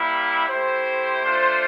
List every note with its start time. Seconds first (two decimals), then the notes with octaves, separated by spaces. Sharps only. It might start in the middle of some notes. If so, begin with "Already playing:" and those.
Already playing: G3 A#3 E4
0.48 A3 E4 G4 C5
1.23 A3 D4 F4